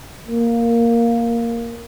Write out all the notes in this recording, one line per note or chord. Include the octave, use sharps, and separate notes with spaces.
A#3